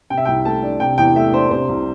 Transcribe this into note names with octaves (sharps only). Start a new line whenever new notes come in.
C3 G5
E5
C2 G5
A3 A5
D4
C3 G5
E2 G5
A3 E5
D4 C5
C3 C5
C2